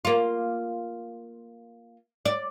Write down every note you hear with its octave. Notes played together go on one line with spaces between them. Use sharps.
A#3 F4
D5